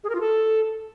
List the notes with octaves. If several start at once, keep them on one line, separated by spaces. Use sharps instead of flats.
G#4
A#4
F4
A4